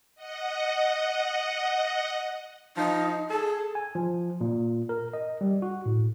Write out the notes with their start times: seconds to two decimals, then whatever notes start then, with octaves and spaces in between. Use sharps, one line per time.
0.15 D#5 F#5
2.77 F3 D#4
3.30 G#4 A4
3.75 G#5
3.95 F3
4.41 A#2
4.89 A#4
5.13 D#5
5.41 G3
5.62 F#4
5.86 A2